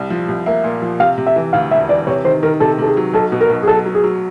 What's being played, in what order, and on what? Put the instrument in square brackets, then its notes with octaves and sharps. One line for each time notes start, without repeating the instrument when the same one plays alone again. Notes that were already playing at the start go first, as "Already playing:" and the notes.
Already playing: [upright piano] C2 G3
F3
C2
[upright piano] A#3 [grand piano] E5
[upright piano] A#2
F3
[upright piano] C3 [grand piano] F5
[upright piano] C3
[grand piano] E5
[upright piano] E3
[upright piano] D2 [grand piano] F5
[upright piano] E1 [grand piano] E5
[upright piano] E3 [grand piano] D5
[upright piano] C3 [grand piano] C#5
[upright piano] D#3 [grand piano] C5
[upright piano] D#3 [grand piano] A#4
[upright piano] C3 [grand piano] A4
[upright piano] C3 [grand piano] A4
[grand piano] G#4
[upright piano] F#3
[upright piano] B1 [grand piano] A4
[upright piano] B2
[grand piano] A#4
[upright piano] B1
[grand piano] G#4
[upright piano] F#3 [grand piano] A4
[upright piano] F#3
[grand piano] G#4
[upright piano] F#3